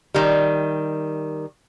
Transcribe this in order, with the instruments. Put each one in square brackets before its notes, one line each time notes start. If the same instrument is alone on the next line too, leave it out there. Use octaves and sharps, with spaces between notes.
[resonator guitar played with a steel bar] D#3 G3